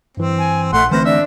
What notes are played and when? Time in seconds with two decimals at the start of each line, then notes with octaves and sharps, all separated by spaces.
0.17 G2 E3 C4
0.39 G#5
0.73 A#1 A3 F#5 C6
0.91 D3 E3 A3 C4 B4 C5 F6 A#6
1.05 D4 E5